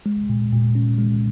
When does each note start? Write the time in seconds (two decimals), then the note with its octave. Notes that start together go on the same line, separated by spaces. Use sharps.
0.06 G#3
0.29 A#2
0.52 A#2
0.75 C#4
0.98 G#3